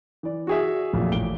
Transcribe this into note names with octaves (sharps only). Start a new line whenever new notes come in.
E3 D5
F#4 G#4 E5
A1 F2 A#2
A1 D7 G7